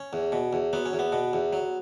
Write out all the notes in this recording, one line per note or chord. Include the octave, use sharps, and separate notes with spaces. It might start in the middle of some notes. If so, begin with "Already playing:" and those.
Already playing: C#4
E2
B2
E2
F#3 B3
C#4
E2
B3
B2
E2
F#3